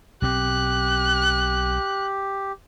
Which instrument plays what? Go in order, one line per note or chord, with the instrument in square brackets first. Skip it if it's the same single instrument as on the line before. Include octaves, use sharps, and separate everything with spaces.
[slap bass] B1 C4 [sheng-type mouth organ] G4 [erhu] F#6